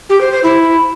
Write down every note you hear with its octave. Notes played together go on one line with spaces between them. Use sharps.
G4
C5
C5
E4